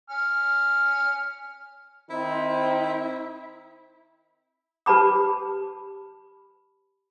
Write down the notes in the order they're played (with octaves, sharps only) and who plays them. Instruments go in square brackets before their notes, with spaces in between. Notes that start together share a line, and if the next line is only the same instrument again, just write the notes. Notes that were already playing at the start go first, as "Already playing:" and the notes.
[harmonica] G#5 F6
[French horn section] D#3 C4 D#4 [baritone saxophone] E4
[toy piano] G4 B4 A5 B5 D6